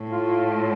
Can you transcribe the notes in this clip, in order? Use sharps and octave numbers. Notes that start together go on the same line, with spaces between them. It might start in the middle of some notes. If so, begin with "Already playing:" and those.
Already playing: A2
F4